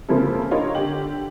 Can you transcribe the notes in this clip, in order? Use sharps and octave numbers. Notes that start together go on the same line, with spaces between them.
C#3 F3 A#3 C4 E4 A4
D4 D#4 F4 A#4 C#5 D#5
D3 G4 F#7